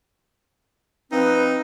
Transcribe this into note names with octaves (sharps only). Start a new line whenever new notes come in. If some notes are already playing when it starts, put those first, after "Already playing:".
F3 C4 D#4 B4